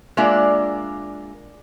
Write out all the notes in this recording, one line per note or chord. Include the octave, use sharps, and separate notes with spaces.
G#3 A#3 D4 F4 D5 E5